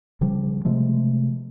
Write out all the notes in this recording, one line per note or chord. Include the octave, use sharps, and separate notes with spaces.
C#3 F3 G3
C3 F3 G#3 A3